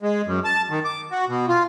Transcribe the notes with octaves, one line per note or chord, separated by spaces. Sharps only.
G#3
F#2
A5
D#3
D6
F#4
B2
F4